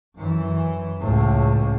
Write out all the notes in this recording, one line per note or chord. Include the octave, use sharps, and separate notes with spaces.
F#2 E3
C#2 A2